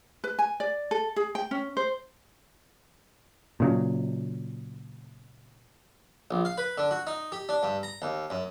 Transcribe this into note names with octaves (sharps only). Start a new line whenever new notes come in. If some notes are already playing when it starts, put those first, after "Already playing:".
B4
G#5
D5
A4
G#4
G5
C#4
C5
A#2 C#3 F#3
A#1
F5
B4
D3
F#4
D#4
G4
D4
G2
A#5
D#2
F#2